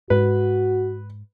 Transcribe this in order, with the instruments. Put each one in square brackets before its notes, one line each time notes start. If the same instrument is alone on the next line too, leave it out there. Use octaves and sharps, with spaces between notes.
[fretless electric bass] G#2 [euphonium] F#4 [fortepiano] B4